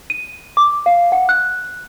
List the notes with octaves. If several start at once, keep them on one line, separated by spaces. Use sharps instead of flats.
D#7
D6
F5
F#5
F#6